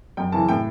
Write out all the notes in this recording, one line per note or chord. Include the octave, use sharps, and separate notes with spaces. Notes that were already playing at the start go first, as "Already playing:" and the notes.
F#2 G5
C#3 E3 A5
A2 G5